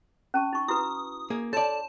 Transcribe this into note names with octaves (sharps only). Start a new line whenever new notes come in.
C#4 A5 C#6
D#4 C#6
E4 F#4 B4 D#6
A#3 G#4
A4 C#5 D5 A5 C6